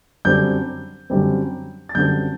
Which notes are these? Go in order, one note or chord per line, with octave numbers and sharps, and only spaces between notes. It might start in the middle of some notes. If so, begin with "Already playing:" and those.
F#2 D3 G3 C4 G6
F#2 D3 G3 C4
A6
F#2 D3 G3 C4 G6